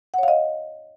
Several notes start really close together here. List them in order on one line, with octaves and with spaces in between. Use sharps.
F#5 C#5 F5 D#5